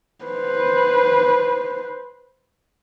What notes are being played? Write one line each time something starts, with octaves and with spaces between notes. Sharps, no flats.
B4 C5